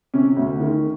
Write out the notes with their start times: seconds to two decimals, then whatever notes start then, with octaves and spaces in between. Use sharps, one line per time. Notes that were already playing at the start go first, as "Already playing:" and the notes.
0.14 C3 C#4
0.36 D2
0.60 D#3